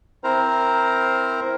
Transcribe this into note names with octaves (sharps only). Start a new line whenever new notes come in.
C4 E4 A#4 C5 A#5